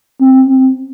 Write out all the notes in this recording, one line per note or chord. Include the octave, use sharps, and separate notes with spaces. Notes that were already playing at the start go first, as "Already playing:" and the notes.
C4